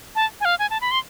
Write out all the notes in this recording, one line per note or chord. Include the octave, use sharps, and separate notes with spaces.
A5
G#5
F5
G#5
A5
B5
C6